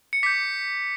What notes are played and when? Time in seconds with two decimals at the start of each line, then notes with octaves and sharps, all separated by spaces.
0.13 C#7
0.23 D6 G6 B6